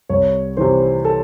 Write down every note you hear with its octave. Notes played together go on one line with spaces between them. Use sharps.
C2 C#5
C3 E3 C5
A4